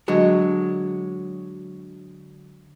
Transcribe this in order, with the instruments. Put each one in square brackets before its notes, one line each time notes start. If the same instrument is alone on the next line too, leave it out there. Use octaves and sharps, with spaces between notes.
[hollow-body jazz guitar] D3 F#3 G#3